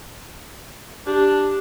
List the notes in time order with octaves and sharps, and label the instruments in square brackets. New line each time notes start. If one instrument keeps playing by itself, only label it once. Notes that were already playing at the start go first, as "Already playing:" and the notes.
[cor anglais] D4 [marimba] G4